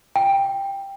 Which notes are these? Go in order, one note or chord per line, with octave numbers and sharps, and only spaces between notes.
G5